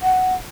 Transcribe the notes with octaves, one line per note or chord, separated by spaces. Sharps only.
F#5